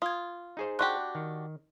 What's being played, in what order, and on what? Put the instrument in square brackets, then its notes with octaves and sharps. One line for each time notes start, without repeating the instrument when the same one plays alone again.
[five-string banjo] F4 [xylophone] D#6 G#6
[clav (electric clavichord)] D#4 G#4 C5
[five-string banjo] D4 F#4 G4 [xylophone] C6 C#6 F#6
[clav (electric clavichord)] D#3